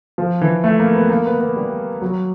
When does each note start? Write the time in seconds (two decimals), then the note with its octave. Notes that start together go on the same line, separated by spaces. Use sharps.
0.18 F3
0.41 E3
0.64 A3
0.79 A#3
0.95 B3
1.09 A#3
1.26 B3
1.41 B3
1.56 G3
2.02 F#3